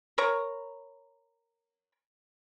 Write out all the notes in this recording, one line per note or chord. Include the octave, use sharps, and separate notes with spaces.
A#4 B4 C#5 A#5